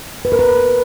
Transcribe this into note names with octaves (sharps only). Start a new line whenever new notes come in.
B4
A#4
B4